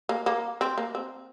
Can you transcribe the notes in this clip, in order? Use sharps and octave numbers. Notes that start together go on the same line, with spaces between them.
A#3
A#3
C4
A#3
C4